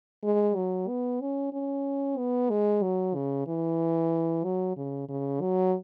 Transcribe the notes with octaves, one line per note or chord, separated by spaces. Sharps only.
G#3
F#3
B3
C#4
C#4
B3
G#3
F#3
C#3
E3
F#3
C#3
C#3
F#3